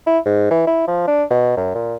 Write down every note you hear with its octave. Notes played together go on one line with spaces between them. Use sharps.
E4
G#2
E3
E4
F3
D4
B2
F#2
A#2